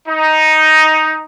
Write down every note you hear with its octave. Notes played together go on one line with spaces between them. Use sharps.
D#4